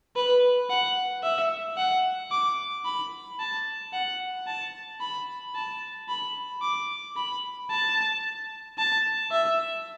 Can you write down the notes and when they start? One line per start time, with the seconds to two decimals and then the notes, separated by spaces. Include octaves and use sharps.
0.16 B4
0.70 F#5
1.23 E5
1.78 F#5
2.31 D6
2.85 B5
3.39 A5
3.93 F#5
4.47 A5
5.01 B5
5.55 A5
6.09 B5
6.62 D6
7.17 B5
7.71 A5
8.78 A5
9.32 E5